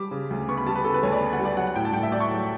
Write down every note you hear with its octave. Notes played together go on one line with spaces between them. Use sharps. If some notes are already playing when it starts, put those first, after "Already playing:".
Already playing: G3 D6
C#3
D2
B3 C#6
B5
G3 A5
B4
C#3 A4
B4
D2 C#5
D5
B3
F#5
G3
D5
F#3 F#5
F#5
A2 G5
A5
A2 G5
E5
A3 D5
C#6
F#3